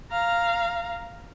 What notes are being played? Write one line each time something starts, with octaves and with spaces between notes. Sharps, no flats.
F5 A#5